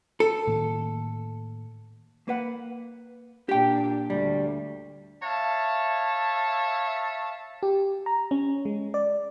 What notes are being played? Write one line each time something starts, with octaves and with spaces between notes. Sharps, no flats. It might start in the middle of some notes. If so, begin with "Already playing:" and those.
A4
A2 D#3 A#3
A#3 B4 F#5
A#2 D4 G4 G5
D2 G3
C#5 E5 F5 A5
G4
A#5
C#4
G#3
D5